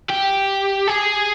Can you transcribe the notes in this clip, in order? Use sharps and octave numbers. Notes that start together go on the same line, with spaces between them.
G4
G#4